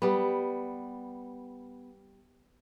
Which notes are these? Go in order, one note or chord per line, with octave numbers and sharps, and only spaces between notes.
G3 B3